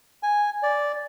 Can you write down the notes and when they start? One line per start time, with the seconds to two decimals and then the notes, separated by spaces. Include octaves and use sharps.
0.23 G#5
0.63 D5